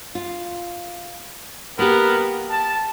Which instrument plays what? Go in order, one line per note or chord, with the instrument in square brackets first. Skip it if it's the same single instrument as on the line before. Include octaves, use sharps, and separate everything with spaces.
[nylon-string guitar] F4
[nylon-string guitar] A#3 G4 [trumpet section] B3 A#4
[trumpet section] A5